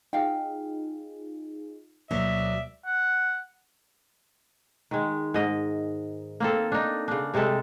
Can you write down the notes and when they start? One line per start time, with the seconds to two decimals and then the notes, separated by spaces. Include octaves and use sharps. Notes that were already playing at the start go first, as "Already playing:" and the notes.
0.13 D#4 F4 G#4 F5 G5
2.11 D2 B2 F#3 A#3 D5 E5
2.86 F#5
4.91 D#3 G#3
5.34 G#2 D#5
6.40 A#3 C4 A4
6.72 D4 D#4
7.08 C#3 D4
7.34 G2 C3 G#3 A4